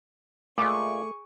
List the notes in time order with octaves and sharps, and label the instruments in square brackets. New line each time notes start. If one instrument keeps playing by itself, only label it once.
[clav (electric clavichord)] A#2 G#3 [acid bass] A3 [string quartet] G#4 C#6 [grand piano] D6